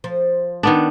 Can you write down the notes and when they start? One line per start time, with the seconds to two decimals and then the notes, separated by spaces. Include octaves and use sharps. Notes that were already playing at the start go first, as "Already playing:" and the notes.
0.04 F3 C5
0.63 D#3 B3 D4